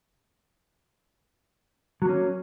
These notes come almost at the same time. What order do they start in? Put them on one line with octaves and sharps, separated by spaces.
F#3 A#3 C#4